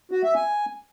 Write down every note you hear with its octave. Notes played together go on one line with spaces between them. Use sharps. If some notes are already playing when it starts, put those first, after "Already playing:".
F#4
E5
G#5